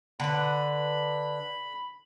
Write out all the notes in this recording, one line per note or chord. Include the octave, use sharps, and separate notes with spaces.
D3 B4 B5